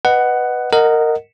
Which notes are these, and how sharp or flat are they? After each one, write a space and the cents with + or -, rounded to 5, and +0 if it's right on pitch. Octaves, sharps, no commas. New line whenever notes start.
B4 +0 D#5 -20 F#5 +10
A#4 -15 D#5 +0 F#5 +0